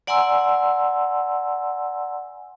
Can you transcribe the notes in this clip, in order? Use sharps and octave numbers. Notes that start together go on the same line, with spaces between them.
D5 F#5 G#5 A#5 C6 E6